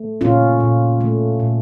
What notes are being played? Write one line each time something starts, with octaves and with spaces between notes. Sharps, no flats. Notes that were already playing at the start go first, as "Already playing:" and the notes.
Already playing: A3
A#2 C#4 F4
A#2
A3
A#2